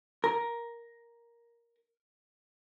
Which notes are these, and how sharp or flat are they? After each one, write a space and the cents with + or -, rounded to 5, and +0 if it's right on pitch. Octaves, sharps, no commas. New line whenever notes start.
A#4 +10